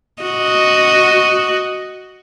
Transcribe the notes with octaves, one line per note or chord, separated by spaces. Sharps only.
F#4 D#5